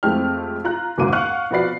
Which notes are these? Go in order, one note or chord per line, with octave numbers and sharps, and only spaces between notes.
F2 G#3 A3 C4 G4 F6
F4 A#5 F#6
F#1 D#2 G#2 B2 D6 D#7
F5 F#5 C#6 F6 F#6
B2 F3 F#4 B4 D5 C7